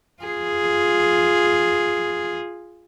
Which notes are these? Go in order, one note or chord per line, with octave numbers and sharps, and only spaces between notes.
F4 G#4